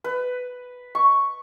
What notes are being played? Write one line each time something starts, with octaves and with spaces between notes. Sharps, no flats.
B4
C#6